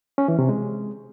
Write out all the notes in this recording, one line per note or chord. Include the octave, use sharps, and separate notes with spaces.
C#4
E3
C3
G#3